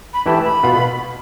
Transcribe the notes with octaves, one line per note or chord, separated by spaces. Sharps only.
B5
E3 A3 E4 G4 B4 A5
B5
B2 B3 F4